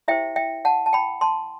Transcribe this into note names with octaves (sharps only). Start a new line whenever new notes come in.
E4 G4 C5 E5 G5
E5 G5
F#5 A5
A5
G5 B5
A5 C6